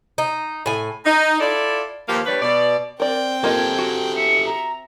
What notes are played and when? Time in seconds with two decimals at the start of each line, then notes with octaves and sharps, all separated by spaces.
0.18 D#4
0.66 A2 G#5
1.05 D#4
1.39 E4 F4 A4 D5
2.09 D#2 F3 A#3 G4 B4 F5
2.25 G3 D4 B4 C#5 D5
2.41 B2 D5
3.00 C4 A#4 D5 G5
3.44 A#3 F4 G4 A4 D#5 G#6
3.78 F#4
4.17 E5 C#7
4.46 A#5